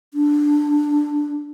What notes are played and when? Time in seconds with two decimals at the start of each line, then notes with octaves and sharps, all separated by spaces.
0.14 D4